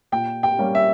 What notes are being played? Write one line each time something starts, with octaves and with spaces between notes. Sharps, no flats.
A#2 G5
G5
G3 A#3 C#4
E5